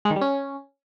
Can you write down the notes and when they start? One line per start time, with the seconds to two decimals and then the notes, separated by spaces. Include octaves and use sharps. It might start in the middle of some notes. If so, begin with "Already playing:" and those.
0.05 G#3
0.11 D#3
0.16 G3
0.21 C#4